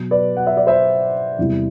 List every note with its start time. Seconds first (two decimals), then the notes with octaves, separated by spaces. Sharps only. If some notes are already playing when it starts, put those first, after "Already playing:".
Already playing: B2 F#3
0.11 B4 D5
0.37 F#5
0.47 E5
0.57 D5
0.67 C5 E5
1.38 E2 C3 E3 G3